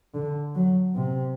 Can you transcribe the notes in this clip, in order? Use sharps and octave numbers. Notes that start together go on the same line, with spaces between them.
D3
F#3
C3